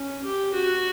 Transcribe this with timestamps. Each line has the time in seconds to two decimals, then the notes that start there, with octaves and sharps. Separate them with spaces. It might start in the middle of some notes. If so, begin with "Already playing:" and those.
Already playing: C#4
0.24 G4
0.54 F#4